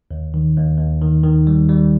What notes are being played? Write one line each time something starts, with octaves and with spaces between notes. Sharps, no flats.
D#2
D#3
D#2
D#2
D#3
D#3
G3
G3